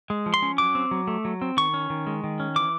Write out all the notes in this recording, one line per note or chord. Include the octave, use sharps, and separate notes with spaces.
G#3
F3
C6
C#4
F#3 D6
C4
F#3
A3
F#3
C4
D#3 C#6
C#4
D#3
G#3
D#3
C#4
E3 D6